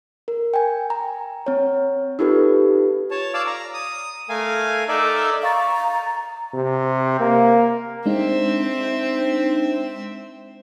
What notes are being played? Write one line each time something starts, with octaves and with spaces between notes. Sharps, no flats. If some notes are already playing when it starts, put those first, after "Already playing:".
A#4
G5 G#5
A#5
C4 C#5
D#4 F4 G4 A4 B4
C#5 A5
D5 F5 A5 D6 E6
A#5
D#6
A3 A#4 F5 G#5
D#4 A4 A#4 D5 E5
F5 A#5 C#6 A6
C3
A#3
G#3 C4 D4 D#4 E5